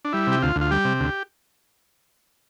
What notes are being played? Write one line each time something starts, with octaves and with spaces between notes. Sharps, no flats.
D4
G3 E4
C3 G4
D2 F4
D2
F4
G3 G4
C3
D2